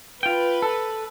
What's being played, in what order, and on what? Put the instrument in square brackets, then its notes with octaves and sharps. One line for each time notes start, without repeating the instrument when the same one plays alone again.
[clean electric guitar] F4 G5 [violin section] B4
[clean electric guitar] A4